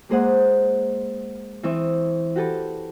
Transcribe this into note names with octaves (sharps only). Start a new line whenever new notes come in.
G#3 A#3 G#4 C5 D#5 F#5
E3 C4 E5 C#6 D#6
F#4 G4 A4 B4